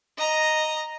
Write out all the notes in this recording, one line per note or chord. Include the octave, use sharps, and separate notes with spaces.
D#5 A#5